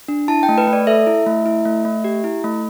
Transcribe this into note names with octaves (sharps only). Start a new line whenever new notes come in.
D4
E4 A5
G5
A3
B4
A3
D5
A4 E5
E4
A3
E4
A3
A3
G4
E4
A3